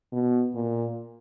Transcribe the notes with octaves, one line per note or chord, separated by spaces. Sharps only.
B2
A#2